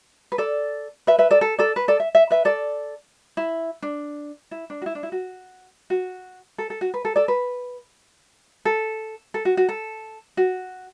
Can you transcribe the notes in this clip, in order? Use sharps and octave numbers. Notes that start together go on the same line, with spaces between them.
B4
A4 D5
B4 E5
B4 E5
A4 D5
A4
A4 D5
B4
A4 D5
E5
E5
B4 E5
A4 D5
E4
D4
E4
D4
F#4
E4
D4
E4
F#4
F#4
A4
A4
F#4
B4
A4
A4 D5
B4
A4
A4
F#4
F#4
A4
F#4